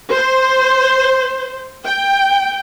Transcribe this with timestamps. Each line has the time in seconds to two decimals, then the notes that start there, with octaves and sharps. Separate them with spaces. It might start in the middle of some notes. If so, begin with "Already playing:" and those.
0.10 C5
1.85 G5